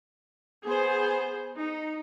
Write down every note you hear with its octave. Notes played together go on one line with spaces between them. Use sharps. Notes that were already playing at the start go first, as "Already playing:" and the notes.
B3 G#4 C5
D#4